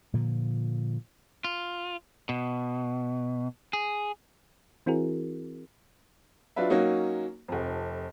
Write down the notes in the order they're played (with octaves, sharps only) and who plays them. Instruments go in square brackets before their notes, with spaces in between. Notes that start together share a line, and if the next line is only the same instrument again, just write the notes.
[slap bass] A#2 D3 F3
[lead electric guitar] F4
B2
G#4
[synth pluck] E3 C4 E4 F#4 G#4 A#4
[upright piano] F#3 D4 F4 B4 E5
F#3 A#3 C#4 D#4 F#4
F1 F2